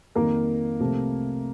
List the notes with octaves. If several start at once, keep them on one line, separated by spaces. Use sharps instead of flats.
F2 D#3 G3 A#3 A#4
C2 C3 F3 A3 C4